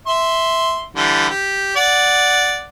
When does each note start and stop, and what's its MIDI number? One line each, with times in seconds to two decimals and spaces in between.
0.07 0.85 76
0.07 0.85 84
0.96 1.27 50
0.96 1.27 52
0.96 1.27 55
1.30 1.76 67
1.77 2.67 74
1.77 2.67 78